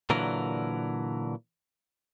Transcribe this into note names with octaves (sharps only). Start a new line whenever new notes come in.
A#2 D3 E3 F#3 A#4